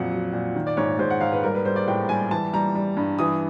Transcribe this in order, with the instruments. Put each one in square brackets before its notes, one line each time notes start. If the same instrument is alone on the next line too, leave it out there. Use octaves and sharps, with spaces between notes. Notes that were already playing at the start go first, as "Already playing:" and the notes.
Already playing: [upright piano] F2 A#2 F#3 F#5
F#3
A#2
D#3
D5
G#2 C#5
G#2 C5
F#5
G#2 F5
B4
G3 A#4
B4
G3 C5
D5
A2 G5
G3 G#5
E3 A5
G3 A#5
G3
G2
E3 D#6